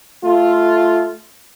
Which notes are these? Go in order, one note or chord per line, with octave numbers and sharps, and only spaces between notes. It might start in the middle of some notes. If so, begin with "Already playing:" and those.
A3 F4